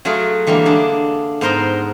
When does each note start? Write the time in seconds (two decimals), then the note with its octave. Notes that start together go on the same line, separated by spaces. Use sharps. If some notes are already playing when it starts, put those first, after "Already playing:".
0.05 F#3 A3 F4 F#4 G#4
0.47 D3 E3 G3 G#3 A#3
0.65 D4 G#4
1.41 G#2 B3 A#4 C5 A#5 C6